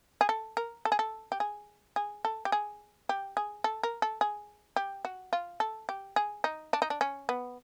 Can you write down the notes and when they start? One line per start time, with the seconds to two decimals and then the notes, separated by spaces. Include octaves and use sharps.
0.21 G#4
0.29 A4
0.57 A#4
0.85 A4
0.92 G#4
0.99 A4
1.32 G4
1.40 G#4
1.96 G#4
2.25 A4
2.45 G4
2.52 G#4
3.09 G4
3.37 G#4
3.64 A4
3.83 A#4
4.02 A4
4.21 G#4
4.76 G4
5.05 F#4
5.33 F4
5.60 A4
5.89 G4
6.16 G#4
6.44 D#4
6.73 D4
6.82 D#4
6.90 D4
7.01 C#4
7.29 B3